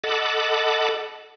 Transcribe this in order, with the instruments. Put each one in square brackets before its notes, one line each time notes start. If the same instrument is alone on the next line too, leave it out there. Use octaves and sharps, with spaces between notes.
[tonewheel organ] A4 D#5 F#5 A5 B5 D6